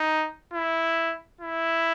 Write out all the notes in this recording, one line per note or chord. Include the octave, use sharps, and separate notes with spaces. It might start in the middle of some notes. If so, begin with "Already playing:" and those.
Already playing: D#4
E4
E4